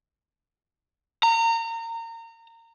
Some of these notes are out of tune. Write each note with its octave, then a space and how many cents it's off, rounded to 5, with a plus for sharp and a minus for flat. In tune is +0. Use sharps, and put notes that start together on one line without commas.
A#5 -25